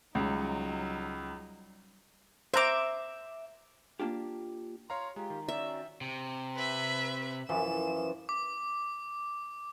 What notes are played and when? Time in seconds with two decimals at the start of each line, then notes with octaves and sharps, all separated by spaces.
0.15 C#2 F#3 G3 D#4
2.54 C5 E5 A#5 D6
4.00 A#3 D4 F4 G4
4.90 C#5 F5 A#5 C6
5.16 G#3 F4 G4 A#5
5.30 D#3
5.48 C#4 F#4 D5 E5
6.01 C3
6.56 B4 E5
7.49 F#2 E3 F3 E7
8.29 D6